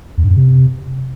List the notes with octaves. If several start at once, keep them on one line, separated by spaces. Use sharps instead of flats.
E2
G2
F#2
C3